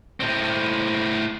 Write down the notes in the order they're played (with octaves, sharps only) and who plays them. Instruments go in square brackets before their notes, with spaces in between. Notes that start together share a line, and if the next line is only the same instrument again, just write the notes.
[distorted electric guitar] A2 C4